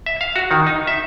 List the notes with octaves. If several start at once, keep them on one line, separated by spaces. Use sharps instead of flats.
E5
F5
F#4
D#3
D#4
E5